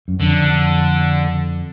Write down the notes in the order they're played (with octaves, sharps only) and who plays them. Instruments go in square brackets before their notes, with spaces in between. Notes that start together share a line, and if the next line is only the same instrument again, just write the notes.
[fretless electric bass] F#2
[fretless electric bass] F2 [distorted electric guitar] D3